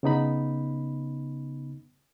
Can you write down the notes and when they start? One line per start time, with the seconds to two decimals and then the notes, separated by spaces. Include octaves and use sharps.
0.03 C#3 B3 D#4 B5